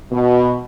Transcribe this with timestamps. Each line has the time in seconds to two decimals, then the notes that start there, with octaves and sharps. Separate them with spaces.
0.11 B2